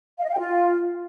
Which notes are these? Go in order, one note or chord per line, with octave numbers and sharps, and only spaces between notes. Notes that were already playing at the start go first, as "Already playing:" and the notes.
F5
D#5
F5
G5
F4